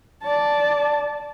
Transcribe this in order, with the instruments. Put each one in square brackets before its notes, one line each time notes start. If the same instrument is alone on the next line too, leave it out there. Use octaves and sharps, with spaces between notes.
[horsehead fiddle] D5 A5